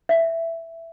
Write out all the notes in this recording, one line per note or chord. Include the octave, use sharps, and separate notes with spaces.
E5